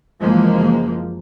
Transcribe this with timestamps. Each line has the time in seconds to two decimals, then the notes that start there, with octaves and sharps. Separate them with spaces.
0.20 F#1 E3 F3 G#3 A#3